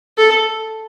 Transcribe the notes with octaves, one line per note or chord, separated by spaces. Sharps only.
A4